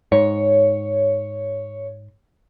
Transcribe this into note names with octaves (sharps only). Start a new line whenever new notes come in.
G#2 C#5